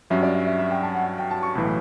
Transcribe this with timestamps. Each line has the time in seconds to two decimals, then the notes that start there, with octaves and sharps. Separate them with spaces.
0.10 G2 F#3 C#4 E5
0.23 D5
0.34 E5
0.47 E5
0.58 E5
0.71 G5
0.83 A5
0.95 F#5
1.06 F#5
1.18 G5
1.31 A5
1.43 C#6
1.55 B1 A2 E3 B5